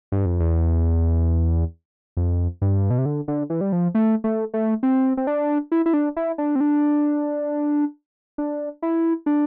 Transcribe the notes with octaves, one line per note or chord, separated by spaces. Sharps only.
G2
F2
E2
F2
G2
B2
C3
D3
D3
E3
G3
F3
A3
A3
A3
C4
C4
D4
E4
E4
D4
E4
D4
C4
D4
D4
E4
D4